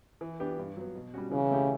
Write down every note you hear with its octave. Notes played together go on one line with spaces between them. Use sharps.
E3
B3 D4 G4 B4
G2
F#3 B3
B2
G3 C#4 F#4
C#3 E3
A3 E4 G4